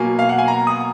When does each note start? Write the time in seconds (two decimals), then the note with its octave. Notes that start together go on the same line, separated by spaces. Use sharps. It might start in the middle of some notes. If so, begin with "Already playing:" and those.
Already playing: B2 F#3 A#3 G#5
0.19 F5
0.29 F#5
0.38 G#5
0.48 A#5
0.67 D#6